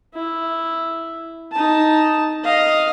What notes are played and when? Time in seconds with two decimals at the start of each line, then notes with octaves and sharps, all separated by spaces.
0.14 E4
1.52 D#4 A5
2.44 D#5 F5